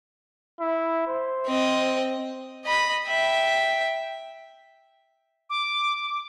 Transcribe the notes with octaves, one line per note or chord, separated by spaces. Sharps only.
E4
C5
C4 D#5
D#5 B5
E5 G5
D6